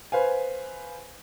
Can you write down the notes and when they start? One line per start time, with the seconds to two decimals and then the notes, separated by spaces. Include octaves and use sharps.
0.12 B4 C5 F5 G#5